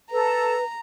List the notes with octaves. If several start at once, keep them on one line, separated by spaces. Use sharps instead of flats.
A4 B4 A#5